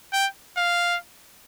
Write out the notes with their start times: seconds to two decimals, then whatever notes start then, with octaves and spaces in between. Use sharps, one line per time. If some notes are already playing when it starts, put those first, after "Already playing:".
0.13 G5
0.57 F5